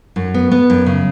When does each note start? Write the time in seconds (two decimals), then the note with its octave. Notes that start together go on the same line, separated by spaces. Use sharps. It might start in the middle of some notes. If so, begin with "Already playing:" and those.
0.16 F#2
0.34 B3
0.51 B3
0.70 F#2
0.86 C#3